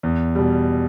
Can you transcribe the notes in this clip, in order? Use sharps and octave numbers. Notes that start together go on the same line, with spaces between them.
E2
B2 G3